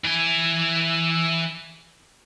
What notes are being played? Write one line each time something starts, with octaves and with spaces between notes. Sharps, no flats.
E3 G#5